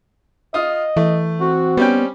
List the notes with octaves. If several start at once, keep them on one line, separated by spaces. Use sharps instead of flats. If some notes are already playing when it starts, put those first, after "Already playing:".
F4 D#5 D#6
E3 A3
C4 F#4
G3 B3 C#4 G5